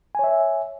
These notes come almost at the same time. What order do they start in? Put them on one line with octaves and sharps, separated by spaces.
G#5 C#5 E5